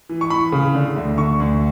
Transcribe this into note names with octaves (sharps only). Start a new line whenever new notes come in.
E3
C#6
E3 B5
C#3
D3
D2
D3 C#6
D2